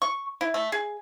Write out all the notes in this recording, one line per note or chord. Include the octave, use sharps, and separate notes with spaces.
C#6
E4
A3
G#4